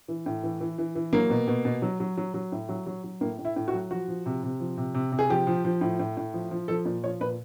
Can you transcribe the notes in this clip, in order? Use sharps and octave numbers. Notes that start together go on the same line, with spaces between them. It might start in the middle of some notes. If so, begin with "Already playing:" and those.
E3
A2
E3
E3
E3
E3
F#3 A#3
B2
B2
B2
F#3
F#3
F#3
F#3
A2
F#3
F#3
F#3
A2 A#3
A2
E4
A2
F#4
F#3
F3 F#4
F3
C3
C3
F3
C3
C3
C3
G#4
F3 G4
F3
F3
A2
A2
A2
F3
F3
F3 A4
A#2
F3 C#5
A#2 B4